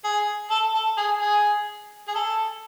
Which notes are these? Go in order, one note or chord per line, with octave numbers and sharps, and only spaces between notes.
G#4
A4
A4
G#4
G#4
G#4
A4